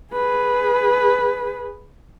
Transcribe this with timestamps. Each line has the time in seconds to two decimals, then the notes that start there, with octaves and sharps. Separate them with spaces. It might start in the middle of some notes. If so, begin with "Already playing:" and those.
0.13 G#4 B4